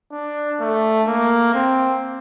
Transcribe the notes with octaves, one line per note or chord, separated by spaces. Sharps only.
D4
A3
A#3
C4